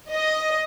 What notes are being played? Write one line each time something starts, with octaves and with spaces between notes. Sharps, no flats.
D#5